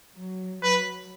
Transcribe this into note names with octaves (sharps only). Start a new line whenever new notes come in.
F#3
F#3 B4